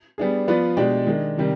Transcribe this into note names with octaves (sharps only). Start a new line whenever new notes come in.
G3 B3 D4 G#4
F3 B3 F4 B4 D5
B2 G#3 D4 G4 D5
D#3 G#3 D4
C3 D#3 G3